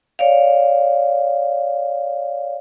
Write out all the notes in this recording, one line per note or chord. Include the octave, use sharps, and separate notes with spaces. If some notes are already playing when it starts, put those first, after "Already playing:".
C#5 D5 F5